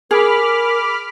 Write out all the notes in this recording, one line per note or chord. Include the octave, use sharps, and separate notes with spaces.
G#4 A#4 B5 D6 F6